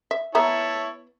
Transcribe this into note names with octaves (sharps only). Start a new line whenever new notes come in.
E5
B3 E4 C#5 E5 A5 A#5